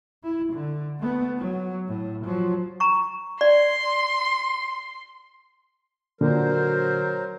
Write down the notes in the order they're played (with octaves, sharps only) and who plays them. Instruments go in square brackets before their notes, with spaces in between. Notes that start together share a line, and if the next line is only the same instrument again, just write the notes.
[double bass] E4
D3
A3 B3
F#3
A2
F3 F#3
[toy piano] A#5 C#6
[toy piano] D5 [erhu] C6
[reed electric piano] A#2 D3 [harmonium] F#3 A#4 C5